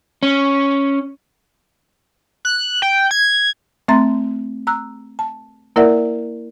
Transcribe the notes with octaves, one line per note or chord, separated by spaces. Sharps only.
C#4
F#6
G5
G#6
A3 C4 E5 A#5 C6 A6
A#5 E6 F#6
A5
A#3 E4 A#4 D5 E5 F#5